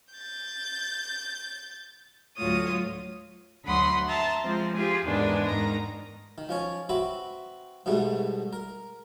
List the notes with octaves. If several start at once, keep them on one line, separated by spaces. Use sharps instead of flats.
G6 A6
D2 A2 F#3 F4 C#5 D#6
D2 F#3 F#5 B5 C6 D#6
E5 A5 A#5 C6
F3 G#3 C4 C5
F4 G4 G#4
E2 G#2 D#3 G#3 D4 B4
G#2 D#3 A#5
D#3
F3 C#4 C#5
C4 F#4 B4 E5
G#2 B2 G3 A3
A#4